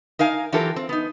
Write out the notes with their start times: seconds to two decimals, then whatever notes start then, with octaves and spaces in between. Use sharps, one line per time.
0.19 D#4 A#4 F5 G#5
0.53 E3 F#3 F4 G4 A4 A#4
0.76 C4
0.89 B3 D#4